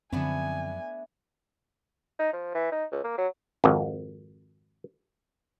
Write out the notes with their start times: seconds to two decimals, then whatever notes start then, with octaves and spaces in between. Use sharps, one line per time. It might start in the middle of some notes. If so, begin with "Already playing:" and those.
0.12 F#2 D3 F3 A3 B3 C4 D4 G#5
2.19 D#4
2.33 F3
2.55 E3
2.72 D#4
2.92 C#2
3.04 A#3
3.18 F#3
3.64 G#1 F2